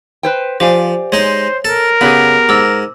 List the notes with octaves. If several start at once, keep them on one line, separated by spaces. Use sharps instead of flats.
B4 C5 G5
F3 G4 C5 D5 F5 G#5
G#3 D#4 C5 C#5
A4 A#4
C#3 B3 G4 G#4 F#7
G#2 D6 E6